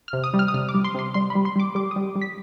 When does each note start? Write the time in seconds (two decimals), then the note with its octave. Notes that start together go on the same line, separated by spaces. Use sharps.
0.08 F6
0.13 C3
0.24 D#6
0.34 G3
0.39 F6
0.48 D#6
0.54 C3 F6
0.69 D6
0.75 G3
0.84 C6
0.95 C3 C6
1.14 G3 C6
1.30 B5
1.35 G3
1.45 C6
1.56 G3 D6
1.75 G3 D6
1.91 G3 D#6
2.16 G3
2.22 B6